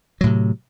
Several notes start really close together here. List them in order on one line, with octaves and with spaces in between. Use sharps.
F#3 A2 C3